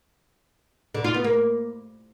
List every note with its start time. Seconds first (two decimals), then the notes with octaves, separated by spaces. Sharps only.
0.95 D3
1.04 F4
1.14 B3
1.24 A#3